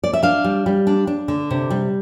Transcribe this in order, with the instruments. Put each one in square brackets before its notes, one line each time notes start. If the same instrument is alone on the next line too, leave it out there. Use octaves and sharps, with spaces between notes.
[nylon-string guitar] D5
E5
D4 F5
G3
G3
D4
D4
D3
C3
G3